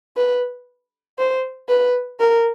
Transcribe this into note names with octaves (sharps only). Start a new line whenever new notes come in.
B4
C5
B4
A#4